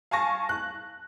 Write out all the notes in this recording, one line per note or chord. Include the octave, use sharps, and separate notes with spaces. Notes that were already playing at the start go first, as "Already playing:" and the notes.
F5 G#5 A5 C#6 A#6
F#6